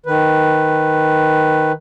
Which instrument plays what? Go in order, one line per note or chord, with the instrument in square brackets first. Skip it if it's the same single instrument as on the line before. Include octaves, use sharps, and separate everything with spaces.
[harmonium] D#3 B4